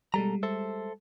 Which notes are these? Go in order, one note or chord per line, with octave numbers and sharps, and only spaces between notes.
B2 G3 G#3 A4 A#5
A4 C5 E5